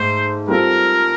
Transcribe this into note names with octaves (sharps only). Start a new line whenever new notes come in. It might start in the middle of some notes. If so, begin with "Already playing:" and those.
Already playing: G#2 A3 C5
G3 C4 F4 A4 A#4